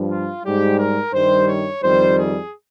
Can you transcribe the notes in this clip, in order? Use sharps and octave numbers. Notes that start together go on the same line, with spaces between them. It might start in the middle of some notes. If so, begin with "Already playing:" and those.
Already playing: G2 F3
F4
G#2 G3 G4
A#4
G2 D#3 G3 C5
C#5
F2 D#3 G3 C5
G#4